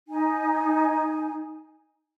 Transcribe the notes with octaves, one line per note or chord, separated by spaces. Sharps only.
D#4 G#5